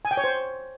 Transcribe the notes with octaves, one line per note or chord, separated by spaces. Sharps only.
G#5
G5
C#5
C5